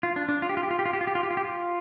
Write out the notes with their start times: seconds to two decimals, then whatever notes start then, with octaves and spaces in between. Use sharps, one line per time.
0.03 F4
0.16 D4
0.29 D4
0.42 F4
0.49 G4
0.57 F4
0.63 G4
0.71 F4
0.79 G4
0.86 F4
0.93 G4
1.01 F4
1.07 G4
1.15 F4
1.23 G4
1.31 F4
1.37 G4
1.45 F4